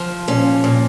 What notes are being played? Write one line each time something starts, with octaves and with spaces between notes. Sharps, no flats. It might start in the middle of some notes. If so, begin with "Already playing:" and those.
Already playing: F3
A#2 C#4
A#2